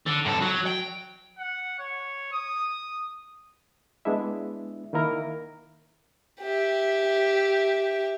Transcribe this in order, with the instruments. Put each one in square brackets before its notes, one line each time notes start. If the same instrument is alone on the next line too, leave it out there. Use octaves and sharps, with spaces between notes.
[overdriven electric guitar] D3
F#2 A4
F#3
G5
[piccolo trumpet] F#5
C#5
D#6
[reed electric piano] G#3 B3 D4 E4 E5
D#3 A#3 E4 A#4
[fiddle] G4 E5